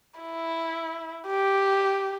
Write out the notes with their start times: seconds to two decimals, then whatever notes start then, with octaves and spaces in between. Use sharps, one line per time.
0.20 E4
1.27 G4